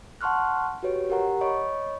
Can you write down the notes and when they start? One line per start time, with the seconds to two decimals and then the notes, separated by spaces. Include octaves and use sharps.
0.21 F#5 A5 C6 C#6 F6 F#6
0.83 F#4 G4 B4 C#5
1.10 G4 A#4 F#5 A#5
1.41 C#5 D#5 B5 C#6